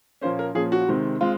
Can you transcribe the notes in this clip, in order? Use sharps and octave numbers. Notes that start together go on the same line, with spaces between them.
A#2 F3 A#3 C#4 C5
A#4
A#2 F3 A#3 C#4 G#4
F#4
C3 D#3 G#3 C4
G#3 C4 F4